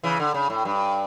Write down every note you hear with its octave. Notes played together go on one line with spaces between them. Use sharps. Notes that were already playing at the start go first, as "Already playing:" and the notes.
C#3 E3
D3
C#3
A2
G2